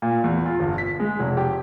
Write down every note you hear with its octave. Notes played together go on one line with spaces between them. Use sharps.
A#2
E2
F4
G1
B6
G#3
F1
G4